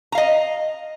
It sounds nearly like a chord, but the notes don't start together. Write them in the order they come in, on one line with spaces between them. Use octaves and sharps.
A#5 F5 D#5